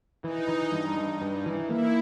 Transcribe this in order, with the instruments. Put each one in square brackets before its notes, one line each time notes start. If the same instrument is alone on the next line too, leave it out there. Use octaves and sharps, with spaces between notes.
[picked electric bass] E3 [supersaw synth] D#4
[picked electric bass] E3
G2
G2
G2
E3
[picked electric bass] A#3 [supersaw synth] E4